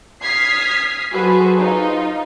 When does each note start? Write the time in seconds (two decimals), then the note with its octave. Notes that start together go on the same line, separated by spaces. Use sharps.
0.22 D#6 F6 G#6 B6 C7
1.12 F#3 F#4 G#4 A4 B4 C5
1.58 D#4 F4